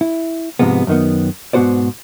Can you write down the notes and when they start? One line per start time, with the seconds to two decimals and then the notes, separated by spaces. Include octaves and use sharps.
0.01 E4
0.59 G#2 C3 F3 G#3 B3
0.87 F#2 D#3 B3
1.53 G#2 B2 B3 F#4 C5 D5